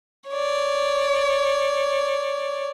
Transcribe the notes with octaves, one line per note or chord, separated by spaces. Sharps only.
C#5 D5